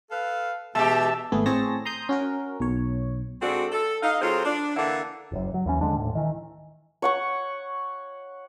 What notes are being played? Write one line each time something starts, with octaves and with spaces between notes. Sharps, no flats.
A4 B4 F5
B2 E3 G#3 G4 E5 A5
G#1 A3 B3 G#4
A2 C4 G#4 C#5 A5 A#6
A#5 C6 D#6 G6
C#4 F#4 A#4
B1 C#5
G#3 C4 D4 F#4 A4
A4
D#4 F5
F#3 C4 F4 G#4 A4 C5
D4
D3 E3 A#3 E5 F#5
F#1 F#2
F#3
D#2 E3 C#4
D#2 D3 G#3 D4
D#1 A2
D#3 E3
C#5 F#5 C#6